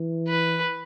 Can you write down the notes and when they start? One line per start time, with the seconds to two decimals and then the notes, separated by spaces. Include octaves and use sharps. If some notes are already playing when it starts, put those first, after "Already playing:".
Already playing: E3
0.28 B4